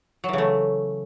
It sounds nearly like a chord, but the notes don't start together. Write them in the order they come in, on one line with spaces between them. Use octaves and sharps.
F#3 E3 C#3 A3